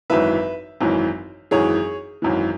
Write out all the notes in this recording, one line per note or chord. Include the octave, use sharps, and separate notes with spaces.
G#1 F#2 E3 B4 E5
G#1 F#2 E3
G#1 F#2 E3 G#4 C#5
G#1 F#2 E3